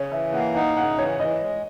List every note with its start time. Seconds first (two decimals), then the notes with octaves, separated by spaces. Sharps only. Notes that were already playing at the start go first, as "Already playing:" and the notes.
Already playing: C#3 C#5
0.11 E3 E5
0.33 A#3 F#5
0.54 D#4 F#5
0.76 C#3 F#5
0.98 E3 C#5
1.20 E3 D#5
1.41 G#3